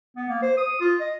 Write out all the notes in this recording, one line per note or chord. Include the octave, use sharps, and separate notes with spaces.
B3
A#3
C5
D#6
F4
D#5